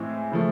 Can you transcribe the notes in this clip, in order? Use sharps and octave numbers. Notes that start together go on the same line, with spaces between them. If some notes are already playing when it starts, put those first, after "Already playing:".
Already playing: A2 E3 G#3 C4
C#3 F3 A3